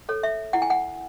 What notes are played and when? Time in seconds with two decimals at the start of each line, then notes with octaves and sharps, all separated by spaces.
0.09 A4 C#5
0.23 E5
0.53 E4 F#5
0.62 G#5
0.70 F#5